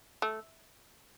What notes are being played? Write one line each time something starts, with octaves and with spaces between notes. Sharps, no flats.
A3